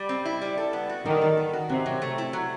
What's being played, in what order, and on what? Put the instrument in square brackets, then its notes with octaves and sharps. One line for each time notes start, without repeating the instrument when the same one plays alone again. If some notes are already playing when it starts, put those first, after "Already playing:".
Already playing: [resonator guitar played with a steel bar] G3
C4
E4
G3
A4
B3
F#4
[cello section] D#3 [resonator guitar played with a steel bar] G3
[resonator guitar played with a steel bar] A4
B3
F#4
[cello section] C3 [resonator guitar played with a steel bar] F#3
[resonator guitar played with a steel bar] F#3
A3
E4
F#3